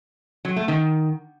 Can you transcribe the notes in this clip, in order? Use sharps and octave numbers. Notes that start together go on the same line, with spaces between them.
F#3
A3
D#3